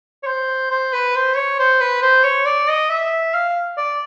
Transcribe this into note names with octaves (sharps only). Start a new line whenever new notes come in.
C#5
C5
C5
B4
C5
C#5
C5
B4
C5
C#5
D5
D#5
E5
F5
D5